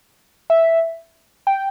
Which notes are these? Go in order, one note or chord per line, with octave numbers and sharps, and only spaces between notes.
E5
G5